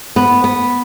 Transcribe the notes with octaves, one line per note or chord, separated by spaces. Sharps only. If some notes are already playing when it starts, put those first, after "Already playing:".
B3
B3